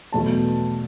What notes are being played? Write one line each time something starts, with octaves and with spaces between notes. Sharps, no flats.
E2 B2 F#3 A3 A5